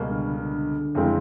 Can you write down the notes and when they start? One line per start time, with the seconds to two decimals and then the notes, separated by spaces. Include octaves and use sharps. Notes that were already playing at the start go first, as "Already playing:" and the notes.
Already playing: C#2 B2 G3 A#3
0.10 D3
0.38 D3
0.95 F2 C#3 E3 G#3 C4